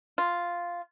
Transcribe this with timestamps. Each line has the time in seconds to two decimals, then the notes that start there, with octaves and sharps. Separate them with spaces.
0.18 F4